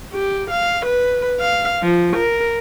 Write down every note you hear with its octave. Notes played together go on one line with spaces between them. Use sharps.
G4
F5
B4
F5
F3
A#4